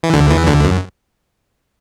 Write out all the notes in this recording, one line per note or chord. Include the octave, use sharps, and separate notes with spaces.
E3
D2 D3
E2 E3
D2 D3
F#2